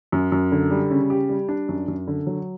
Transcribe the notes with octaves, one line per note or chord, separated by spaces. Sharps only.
F#2
F#2
D3
G3
C#3
G4
G3
D4
F#2
F#2
D3
F#3